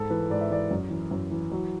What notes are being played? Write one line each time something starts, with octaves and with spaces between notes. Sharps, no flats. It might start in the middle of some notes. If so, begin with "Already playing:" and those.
Already playing: G#2 A4
E3 B4
G#2 D5
E5
E3 D5
F#2
E3
F#2
E3
F#3